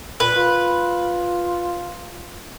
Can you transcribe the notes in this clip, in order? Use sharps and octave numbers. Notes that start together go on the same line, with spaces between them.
A#2 B4
F4